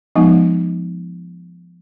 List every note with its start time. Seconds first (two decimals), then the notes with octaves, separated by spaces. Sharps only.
0.15 F3 G#3 B3 D#4